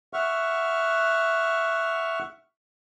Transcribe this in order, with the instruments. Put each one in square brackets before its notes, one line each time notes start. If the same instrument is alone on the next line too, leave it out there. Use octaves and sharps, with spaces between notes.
[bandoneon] E5 F#5 C#6 F6